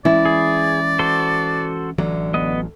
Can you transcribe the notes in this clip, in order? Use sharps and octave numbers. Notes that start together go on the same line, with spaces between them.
E3 G#3 C#4 E4 D5
G#4
F#4 A4 C5
A1 D3 E3 F#3
B3 D#5